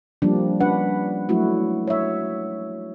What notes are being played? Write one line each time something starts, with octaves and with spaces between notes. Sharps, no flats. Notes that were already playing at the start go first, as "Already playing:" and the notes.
F3 G3 A#3 D4
C#4 D4 B4 F#5
F#3 A3 E4 F#4
C#5 E5